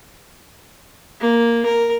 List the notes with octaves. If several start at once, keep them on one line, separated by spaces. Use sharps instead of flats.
A#3
A#4